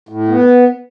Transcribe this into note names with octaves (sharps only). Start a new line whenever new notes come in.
A2
B3